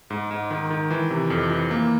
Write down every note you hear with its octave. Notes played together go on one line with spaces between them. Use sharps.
G#2
G#2
D#3
D#3
E3
C3
F2
E3
A#3